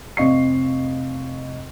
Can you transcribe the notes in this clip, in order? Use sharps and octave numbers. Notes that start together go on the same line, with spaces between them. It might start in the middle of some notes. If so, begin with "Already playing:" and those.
F1 C4 D#5 F5 C#6 C7